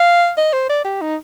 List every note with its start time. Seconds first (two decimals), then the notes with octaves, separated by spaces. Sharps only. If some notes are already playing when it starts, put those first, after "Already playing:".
Already playing: F5
0.37 D#5
0.53 C5
0.69 D5
0.85 G4
1.01 D#4